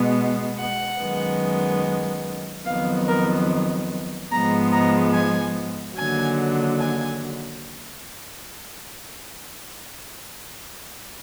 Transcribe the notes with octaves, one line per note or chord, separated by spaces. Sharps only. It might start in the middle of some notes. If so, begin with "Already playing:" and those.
Already playing: B2 G#3 B3
F#5
F#2 D#3 G#3 B3
F2 D#3 F#3 B3 F5
A#4
G#2 F3 G#3 B3 A#5
A#5
G#5
D#2 D3 F#3 G#5
G#5